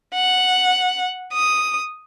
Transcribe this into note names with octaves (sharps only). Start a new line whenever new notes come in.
F#5
D#6